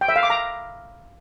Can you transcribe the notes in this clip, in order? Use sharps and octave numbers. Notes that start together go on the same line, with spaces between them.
G5
E5
F5
D6
A#5